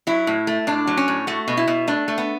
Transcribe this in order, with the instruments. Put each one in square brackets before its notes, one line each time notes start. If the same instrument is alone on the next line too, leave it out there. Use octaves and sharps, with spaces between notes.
[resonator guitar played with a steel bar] F#3 E4
A2
A3
A2 D4
F#3
C#4
A2
A3 F#4
B2
E4
B2
A3 D4
A3
B3